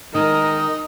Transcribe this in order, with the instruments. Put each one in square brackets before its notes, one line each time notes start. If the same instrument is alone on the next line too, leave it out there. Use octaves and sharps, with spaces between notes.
[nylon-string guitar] D#3 G#3 [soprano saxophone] D#4 [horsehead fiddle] A#4 [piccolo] D#6